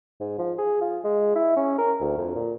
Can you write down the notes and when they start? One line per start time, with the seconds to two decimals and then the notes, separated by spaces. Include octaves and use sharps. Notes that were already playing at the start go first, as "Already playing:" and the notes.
0.20 G#2
0.38 F3
0.58 G#4
0.81 F4
1.04 G#3
1.35 E4
1.57 C#4
1.78 A#4
2.01 D2
2.18 F2
2.35 A#2